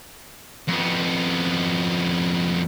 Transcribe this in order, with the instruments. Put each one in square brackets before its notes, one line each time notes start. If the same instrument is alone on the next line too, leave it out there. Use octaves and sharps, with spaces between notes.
[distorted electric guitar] F2 B3